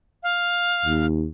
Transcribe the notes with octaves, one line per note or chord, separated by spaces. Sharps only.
F5
D#2